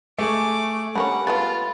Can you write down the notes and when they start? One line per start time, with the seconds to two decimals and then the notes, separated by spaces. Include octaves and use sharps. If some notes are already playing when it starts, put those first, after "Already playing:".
0.19 A3 G#4 C#6 D6
0.95 D3 G3 A#3 C#4 F#5 B5
1.27 G#3 A3 B3 F4 A6